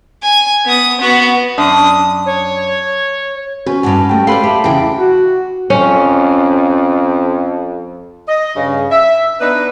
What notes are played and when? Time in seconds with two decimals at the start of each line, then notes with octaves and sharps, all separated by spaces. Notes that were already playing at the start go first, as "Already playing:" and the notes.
0.22 G#5
0.65 B3 D#6
1.00 B3 F#4
1.58 F#2 D4 D#6
2.26 C#5
3.66 C#4 F#4 B4
3.83 E2 G2 F#5 A5 B5
4.09 A3 F#4 G4 G5
4.27 A4 B4 D5 F5 B5 C6
4.44 G4 E5 A5
4.64 E2 C#3 E4 G4 G5
4.99 F#4
5.70 F2 C#4
8.28 D#5
8.55 G2 C#3
8.91 E5
9.41 B3 D4 D#4 B4